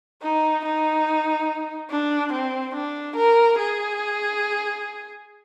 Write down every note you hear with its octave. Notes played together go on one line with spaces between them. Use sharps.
D#4
D#4
D4
C4
D4
A#4
G#4